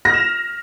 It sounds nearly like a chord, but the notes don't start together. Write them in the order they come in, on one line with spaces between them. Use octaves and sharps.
A#6 F6 E7 F7